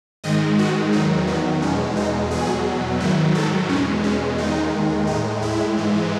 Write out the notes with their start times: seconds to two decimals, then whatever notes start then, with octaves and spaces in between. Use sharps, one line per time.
0.24 G#2 D#3 G#3 D#5
0.58 F#4
0.92 E2 D#3 F#3 D#4
1.27 B3
1.62 E2 B2 G#3 C#4
1.96 D#4
2.31 E2 B2 F#3 G#4
3.00 G#2 D#3 F#3 E4
3.35 A4
3.69 E2 B2 G#3 C#4
4.04 C#4
4.38 D#2 D#3 G#3 D#4
5.07 A2 G#3 D#4
5.42 E4
5.77 G#2 E3 G#3